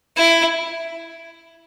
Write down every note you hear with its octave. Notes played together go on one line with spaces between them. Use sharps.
E4